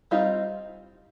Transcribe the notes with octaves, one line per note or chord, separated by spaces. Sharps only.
G3 C4 D#4 F4